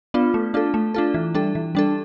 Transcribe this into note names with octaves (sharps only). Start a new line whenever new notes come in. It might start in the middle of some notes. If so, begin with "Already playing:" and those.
B3 D4 F4
A3
D4 F4 A4
A3
D4 F4 A4
E3
G3 D4 A4
E3
G3 D4 A4